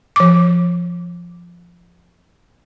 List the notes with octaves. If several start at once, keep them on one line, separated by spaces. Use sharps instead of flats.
F3 D6